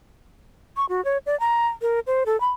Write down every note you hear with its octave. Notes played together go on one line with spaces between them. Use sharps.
C#6
F#4
C#5
D5
A#5
A#4
C5
A4
B5